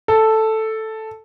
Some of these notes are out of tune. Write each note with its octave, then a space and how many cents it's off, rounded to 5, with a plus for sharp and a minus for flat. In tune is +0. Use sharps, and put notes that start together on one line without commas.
A4 +0